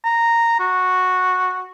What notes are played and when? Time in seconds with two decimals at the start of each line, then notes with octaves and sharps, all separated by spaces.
0.04 A#5
0.60 F#4